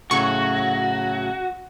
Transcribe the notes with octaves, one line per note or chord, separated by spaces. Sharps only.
A2 C#3 F#3 F#4 C#6